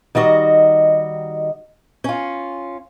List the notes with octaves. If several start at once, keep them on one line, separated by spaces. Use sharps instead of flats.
D#3 G3 F#4 D#5
C#4 F4